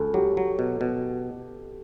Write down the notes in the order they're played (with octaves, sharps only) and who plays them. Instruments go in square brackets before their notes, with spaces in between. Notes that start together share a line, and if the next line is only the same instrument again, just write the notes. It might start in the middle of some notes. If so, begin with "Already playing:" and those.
Already playing: [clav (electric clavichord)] C#2 [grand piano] A4
[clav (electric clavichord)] F#3 [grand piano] G4
[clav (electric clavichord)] F#3
B2
B2